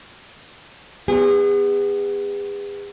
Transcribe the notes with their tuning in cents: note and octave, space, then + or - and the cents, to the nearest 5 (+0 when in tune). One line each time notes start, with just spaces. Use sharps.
B3 +15 G#4 -40